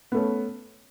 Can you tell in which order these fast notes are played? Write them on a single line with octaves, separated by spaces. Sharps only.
B3 A3 C#4